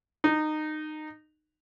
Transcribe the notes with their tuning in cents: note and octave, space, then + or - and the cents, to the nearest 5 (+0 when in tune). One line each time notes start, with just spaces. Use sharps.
D#4 -20